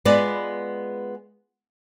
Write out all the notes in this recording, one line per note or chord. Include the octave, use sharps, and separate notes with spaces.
G#3 B3 F4 G#4 B4 D5